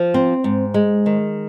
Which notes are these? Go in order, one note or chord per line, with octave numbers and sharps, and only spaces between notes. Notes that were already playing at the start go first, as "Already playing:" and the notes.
Already playing: F3
C4
G#2
G#3
D#3